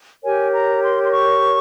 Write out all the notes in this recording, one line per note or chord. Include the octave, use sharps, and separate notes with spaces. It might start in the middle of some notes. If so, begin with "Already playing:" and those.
G4 A#4 C#5 G#5
A#5
C6
C6
C#6